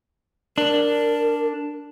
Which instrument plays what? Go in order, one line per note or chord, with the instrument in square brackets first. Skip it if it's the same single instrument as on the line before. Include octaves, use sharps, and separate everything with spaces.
[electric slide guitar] D4 [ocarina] A#4